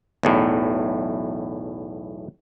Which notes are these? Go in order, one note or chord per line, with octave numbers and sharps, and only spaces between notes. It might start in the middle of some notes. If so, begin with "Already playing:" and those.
B1 E2 A2